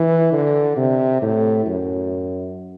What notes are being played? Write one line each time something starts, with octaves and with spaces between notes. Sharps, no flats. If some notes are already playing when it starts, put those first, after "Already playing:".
Already playing: E3
D3
C3
A2
F#2